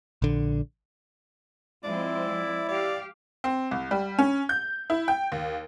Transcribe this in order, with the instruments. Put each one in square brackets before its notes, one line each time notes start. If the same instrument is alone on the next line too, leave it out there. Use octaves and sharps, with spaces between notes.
[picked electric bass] A#1 D3
[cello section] F3 G#3 C4 [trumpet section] E4 [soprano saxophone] D5
[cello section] G4 F5 [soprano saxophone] D5
[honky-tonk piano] C4
C2
G3
C#4
G6
E4
G5
D#2